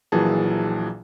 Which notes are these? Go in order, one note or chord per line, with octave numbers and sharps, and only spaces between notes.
A#1 A#2 E3 F#3 G#4 A5